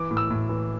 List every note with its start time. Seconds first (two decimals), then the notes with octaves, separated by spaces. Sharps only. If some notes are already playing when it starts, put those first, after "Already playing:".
Already playing: E3 D6
0.11 A2
0.17 E6
0.30 A2
0.49 E3